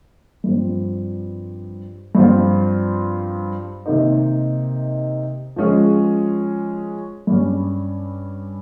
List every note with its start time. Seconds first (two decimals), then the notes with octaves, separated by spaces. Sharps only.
0.44 G2 F3 C4
2.15 G2 F3 C4 F4
3.86 C3 D#3 A#3 D#4
5.56 F3 G#3 C#4 G#4
7.27 G2 G3 C#4